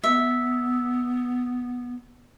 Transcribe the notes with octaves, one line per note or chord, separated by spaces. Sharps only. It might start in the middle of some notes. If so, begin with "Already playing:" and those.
B3 E5